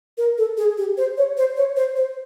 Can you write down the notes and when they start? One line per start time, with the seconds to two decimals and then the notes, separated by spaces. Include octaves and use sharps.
0.18 A#4
0.38 A4
0.57 G#4
0.78 G4
0.98 C5
1.17 C#5
1.37 C5
1.57 C#5
1.76 C5
1.96 C5